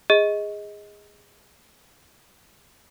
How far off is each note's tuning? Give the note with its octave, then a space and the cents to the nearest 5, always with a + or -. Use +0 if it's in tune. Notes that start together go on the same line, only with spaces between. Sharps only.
G#4 -15 D#5 +15